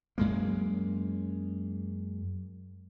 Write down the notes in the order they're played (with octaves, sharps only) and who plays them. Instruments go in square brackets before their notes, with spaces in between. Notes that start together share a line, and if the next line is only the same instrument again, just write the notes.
[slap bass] F#2 G#3 A#3